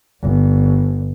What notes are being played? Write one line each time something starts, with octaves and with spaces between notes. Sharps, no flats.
G1